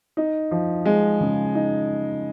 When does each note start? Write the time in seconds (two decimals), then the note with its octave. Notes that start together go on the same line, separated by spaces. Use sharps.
0.17 D#4
0.51 F3
0.85 G#3
1.21 C#3
1.55 D#4